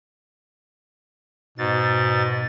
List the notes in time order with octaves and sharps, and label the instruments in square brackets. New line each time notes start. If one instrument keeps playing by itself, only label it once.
[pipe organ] G#2 A6 [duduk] B2